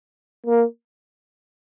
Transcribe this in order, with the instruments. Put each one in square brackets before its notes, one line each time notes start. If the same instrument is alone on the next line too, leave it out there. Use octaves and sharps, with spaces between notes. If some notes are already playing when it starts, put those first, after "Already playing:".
[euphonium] A#3